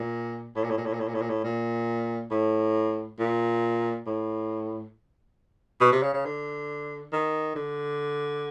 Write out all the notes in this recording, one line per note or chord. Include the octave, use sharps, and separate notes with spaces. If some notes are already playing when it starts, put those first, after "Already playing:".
Already playing: A#2
A2
A#2
A2
A#2
A2
A#2
A2
A#2
A2
A#2
A2
A#2
A2
A#2
A2
B2
C3
C#3
C#3
D3
D#3
D3